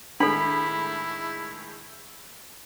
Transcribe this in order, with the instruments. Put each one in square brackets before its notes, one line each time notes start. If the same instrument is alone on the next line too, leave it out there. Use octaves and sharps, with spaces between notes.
[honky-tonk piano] A2 D#3 G#3 [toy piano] D4 A4 [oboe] E4 [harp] B5